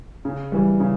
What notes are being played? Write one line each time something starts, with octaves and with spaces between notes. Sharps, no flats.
C#3
E3 G3
C#3